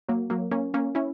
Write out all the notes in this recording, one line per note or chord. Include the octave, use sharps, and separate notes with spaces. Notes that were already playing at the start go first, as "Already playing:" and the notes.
F#3 A#3
F#3 A#3
A#3 C#4
A#3 C#4
C#4 E4